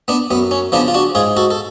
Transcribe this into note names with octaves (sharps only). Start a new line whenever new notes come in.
B3 D4
F#2 B3
C#4
C#3 F3 B3 D4
F4
D4 F#4
G#2 F4 G#4
F#4 A4
A4